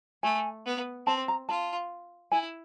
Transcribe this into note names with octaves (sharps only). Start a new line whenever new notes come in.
A3 G#5
B3
C4 A5
A#5
F4 A5
E4 G#5